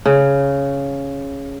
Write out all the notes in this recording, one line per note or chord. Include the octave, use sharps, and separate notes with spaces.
C#3